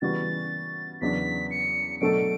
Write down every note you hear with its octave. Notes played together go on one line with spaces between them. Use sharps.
C#3 E3 G3 B3 F#4 A6
E2 C#3 F#3 B3 D4 B6
C#7
B2 F#3 A3 D4 A4 D7